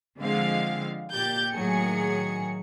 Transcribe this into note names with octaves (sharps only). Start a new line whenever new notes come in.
D3 F3 G#3 C4 F5
A#2 G4 G6 A6
A2 D#3 F#3 G#4 C#7